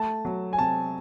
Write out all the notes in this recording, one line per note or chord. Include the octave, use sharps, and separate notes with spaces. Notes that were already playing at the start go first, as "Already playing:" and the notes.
Already playing: A3 A5
F#3
G#5
C3 A5